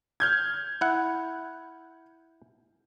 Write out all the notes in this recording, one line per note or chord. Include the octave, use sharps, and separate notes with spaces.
F6 G6 G#6
E4 F#5